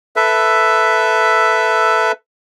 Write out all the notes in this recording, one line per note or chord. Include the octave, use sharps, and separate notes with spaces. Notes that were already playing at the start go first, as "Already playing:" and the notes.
A4 B4 E5